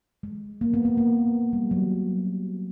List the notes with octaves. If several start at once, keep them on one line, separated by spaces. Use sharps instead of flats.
G#3
A#3
B3
B3
A#3
G3
F#3